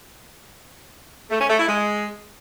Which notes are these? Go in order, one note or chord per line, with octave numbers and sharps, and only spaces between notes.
A3
C#4
A3
E4
G#3